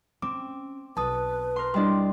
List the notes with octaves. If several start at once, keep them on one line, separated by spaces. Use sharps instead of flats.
C4 C#4 D6
B1 B4 A5 D#6
A#4 C6
G3 D4 E4 D#5 C6